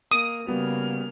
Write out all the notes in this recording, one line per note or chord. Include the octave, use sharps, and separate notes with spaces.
A#3 D#6
C#3 G3 A#3 B3 F#4 F6